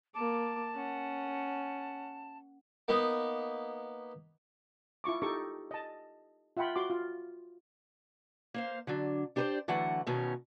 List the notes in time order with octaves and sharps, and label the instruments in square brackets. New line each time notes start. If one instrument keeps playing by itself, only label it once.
[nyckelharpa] A#3 D6 [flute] A5
[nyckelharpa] C#4 F#5
[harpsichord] A#3 B3 D#4
[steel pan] E4 F4 C#6 D6
D#4 G4 A4 C#6 D6
D#5 A5
F4 E5 F#5 G5 B5 C6
F#4 C6 D6
F4
[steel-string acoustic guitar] A#3 C5 F5
D3 F#3 D4
D4 G4 G#4 B4 C5 D5
D3 E3 F#3 A3 F#5
E2 B2 D#3 C#4